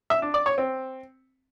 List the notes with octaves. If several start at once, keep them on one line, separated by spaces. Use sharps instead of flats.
E5
D4
D5
C#5
C4